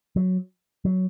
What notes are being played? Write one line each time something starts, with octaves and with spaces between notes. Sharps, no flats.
F#3
F#3